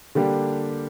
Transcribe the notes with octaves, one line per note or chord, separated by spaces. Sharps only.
D3 G3 A#3 D4 G4